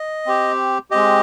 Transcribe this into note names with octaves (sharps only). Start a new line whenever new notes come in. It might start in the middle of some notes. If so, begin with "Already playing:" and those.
Already playing: D#5
C4 G4
G#3 C4 G4 D#5